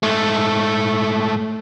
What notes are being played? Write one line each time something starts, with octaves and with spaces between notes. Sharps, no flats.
G#2 A3